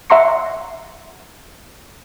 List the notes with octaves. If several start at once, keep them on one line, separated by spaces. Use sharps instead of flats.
E5 F#5 A#5 C6 C#6 C#7